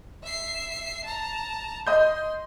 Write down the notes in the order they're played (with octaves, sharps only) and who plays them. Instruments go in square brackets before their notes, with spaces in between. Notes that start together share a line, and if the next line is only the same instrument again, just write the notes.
[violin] E5 C7
A5 A#5
[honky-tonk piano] D#5 G6 [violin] C6